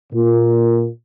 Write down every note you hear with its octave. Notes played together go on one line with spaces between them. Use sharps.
A#2